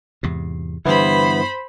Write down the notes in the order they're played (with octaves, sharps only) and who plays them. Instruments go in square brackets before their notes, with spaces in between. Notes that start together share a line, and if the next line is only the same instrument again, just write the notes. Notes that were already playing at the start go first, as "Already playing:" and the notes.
[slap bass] E2 G#2 C3
[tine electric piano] G2 B3 E4 [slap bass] D3 E3 [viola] C5 B5